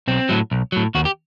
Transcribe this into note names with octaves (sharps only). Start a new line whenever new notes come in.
B1 C4
A2 F#3
B1
A2 F#3
D#2 F#4
G4